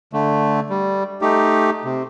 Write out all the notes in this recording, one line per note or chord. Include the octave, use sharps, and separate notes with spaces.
D3 A3
G3
A3 D#4 G4
C3